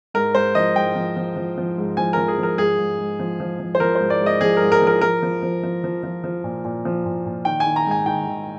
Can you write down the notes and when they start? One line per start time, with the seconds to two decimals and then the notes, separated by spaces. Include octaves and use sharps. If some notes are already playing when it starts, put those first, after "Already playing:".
0.14 G#2 A#4
0.35 G#2 C5
0.55 F3 D#5
0.75 G#2 G5
0.96 F3
1.16 F3
1.36 F3
1.58 F3
1.78 G#2
1.97 F3 G#5
2.13 F3 A#4
2.28 G#4
2.38 F3 A#4
2.58 G#2 G#4
2.78 G#2
2.99 G#2
3.19 F3
3.40 F3
3.59 F3
3.75 C5
3.80 F3 A#4
3.95 C5
4.00 G#2
4.10 D5
4.21 G#2
4.26 D#5
4.41 F3 G#4
4.57 G#2 A#4
4.72 A#4
4.82 F3 A#4
5.01 F3 A#4
5.23 F3
5.43 F3
5.63 F3
5.84 F3
6.03 F3
6.24 F3
6.44 A#2
6.65 A#2
6.85 F3
7.06 A#2
7.26 A#2
7.45 D#3 G5
7.60 G#5
7.66 D#3
7.76 A#5
7.87 G#2 G#5
8.06 D#3 G5
8.27 D#3